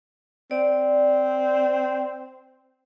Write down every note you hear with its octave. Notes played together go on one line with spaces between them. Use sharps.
C4 D5